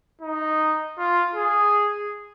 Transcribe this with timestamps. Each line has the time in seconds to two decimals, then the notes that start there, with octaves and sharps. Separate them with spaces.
0.21 D#4
0.98 F4
1.35 G#4